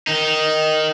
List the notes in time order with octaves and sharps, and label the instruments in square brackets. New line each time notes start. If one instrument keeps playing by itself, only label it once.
[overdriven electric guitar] D#3 D#4